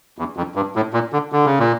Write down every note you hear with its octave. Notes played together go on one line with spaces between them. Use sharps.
E2
F2
G2
A2
A#2
D3
D3
C#3
A#2